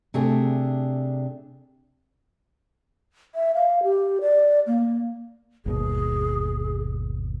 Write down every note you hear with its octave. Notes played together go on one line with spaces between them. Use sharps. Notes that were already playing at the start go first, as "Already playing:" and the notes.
C3 A3 D4 G#4
E5
F5
G4
D5
A#3
G1 D#2 B2 G#4